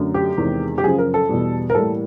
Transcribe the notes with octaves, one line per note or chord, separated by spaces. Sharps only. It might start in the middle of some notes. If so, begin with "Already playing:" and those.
Already playing: F#2 D3 F#3 A3
G4
E2 C3 D#3 G#3
G4
F#2 C#3 F3 G#4
A#4
A4
E2 B2 G3
A#4
A2 E3 G3 A#3 A4